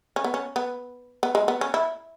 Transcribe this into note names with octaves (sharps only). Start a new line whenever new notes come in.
C#4
B3
C#4
B3
B3
G#3
B3
C#4
E4